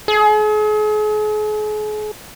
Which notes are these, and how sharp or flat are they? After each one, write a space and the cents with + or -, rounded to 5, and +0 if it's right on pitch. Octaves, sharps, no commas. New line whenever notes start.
G#4 +40